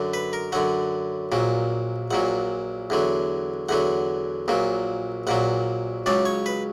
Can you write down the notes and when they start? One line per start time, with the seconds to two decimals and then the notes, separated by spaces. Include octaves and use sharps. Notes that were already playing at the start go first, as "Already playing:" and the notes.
Already playing: F#2 D3 F#3
0.14 B4
0.33 A#4
0.52 F#2 D3 F#3 F#5
1.32 A#1 A#2 F#3
2.11 A#1 A#2 F#3 F#5
2.90 E2 D3 F#3
3.69 E2 D3 F#3 F#5
4.48 A#1 A#2 F#3
5.27 A#1 A#2 F#3 F#5
6.06 C#2 C#3 F#3 D5
6.25 C#5
6.46 B4